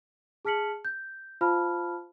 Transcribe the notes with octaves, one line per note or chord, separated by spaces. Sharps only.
G#4 A5 F6 B6 C#7 F#7
G6
F4 C5 F5 A5 B5 F6